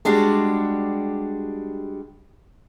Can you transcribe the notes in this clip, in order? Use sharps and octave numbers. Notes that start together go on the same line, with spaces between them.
G3 G#3 D4 F#4 G4